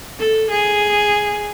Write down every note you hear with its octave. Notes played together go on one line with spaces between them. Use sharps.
A4
G#4